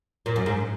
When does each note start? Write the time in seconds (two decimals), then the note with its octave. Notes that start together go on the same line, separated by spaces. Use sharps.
0.26 A#2
0.36 F#2
0.46 G#2